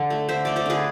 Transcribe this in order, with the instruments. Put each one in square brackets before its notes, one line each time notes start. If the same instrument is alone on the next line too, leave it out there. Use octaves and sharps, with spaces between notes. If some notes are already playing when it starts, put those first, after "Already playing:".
Already playing: [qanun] D3
A3
D3 C5 E5
A3 D5
A4 C5
D3 G#4 B4